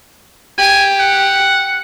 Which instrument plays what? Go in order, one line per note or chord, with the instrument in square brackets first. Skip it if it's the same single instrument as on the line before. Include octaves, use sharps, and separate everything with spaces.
[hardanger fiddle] G4 [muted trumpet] G#5
[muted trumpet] F#5